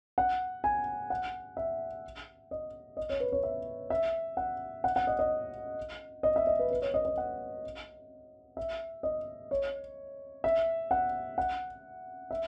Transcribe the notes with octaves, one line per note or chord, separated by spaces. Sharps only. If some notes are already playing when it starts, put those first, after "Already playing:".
F#5
G#5
F#5
E5
D#5
D#5
C#5
B4
C#5
E5
E5
F#5
F#5
F#5
D#5
D#5
D#5
E5
D#5
B4
B4
C#5
D#5
D#5
F#5
E5
D#5
C#5
E5
F#5
F#5
E5